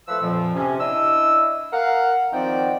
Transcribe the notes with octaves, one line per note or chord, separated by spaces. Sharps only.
F3 A3 B4 E6
F2 A#2 F3
C3 C#4
D4 E4 D#5 E6
A#4 F5 F#5
D#3 F3 C4 D5 F#5 G5